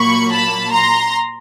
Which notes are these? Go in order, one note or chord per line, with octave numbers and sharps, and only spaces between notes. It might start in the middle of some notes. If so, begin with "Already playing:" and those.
Already playing: A#2 F#3 A#3 B5 C#6
A5 B5
A#5 C6